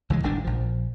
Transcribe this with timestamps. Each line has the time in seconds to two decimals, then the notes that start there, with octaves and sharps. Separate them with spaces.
0.10 C#2 E3 G3 G#3
0.23 G1 A2 D#3 D4
0.44 A#1 F3